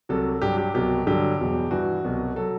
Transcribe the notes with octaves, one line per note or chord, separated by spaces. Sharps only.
C2 C3 F#3 A4
G2 F#3 G4
G4
C2 B2 F#3 G4
G2 D3 F#3 G4
E2 B2 F#3
G2 E3 F#4
C2 B2 F#3
F#3 A4